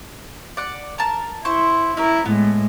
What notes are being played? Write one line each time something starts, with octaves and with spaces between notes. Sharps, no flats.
D5 F#5
A#4 A5
E4 C5 C#6
C#4 E4 A#4
A2 G#3 B3